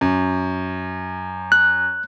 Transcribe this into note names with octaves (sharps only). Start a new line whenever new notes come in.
F#2
F#6